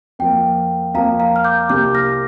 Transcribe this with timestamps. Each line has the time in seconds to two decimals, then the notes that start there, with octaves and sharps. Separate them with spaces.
0.19 F2 F3 A#3 G5
0.94 F2 F3 A#3 F5 A#5
1.20 F5 A#5
1.36 F6
1.44 D6 G6
1.69 C2 C3 A#3 G4 D6 G6
1.95 F6 A#6